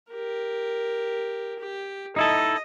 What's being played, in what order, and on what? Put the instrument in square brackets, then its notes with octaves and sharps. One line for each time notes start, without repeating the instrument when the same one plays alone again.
[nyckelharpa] G4 A#4
G4
[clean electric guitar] D#4 E4 A4 [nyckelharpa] D#5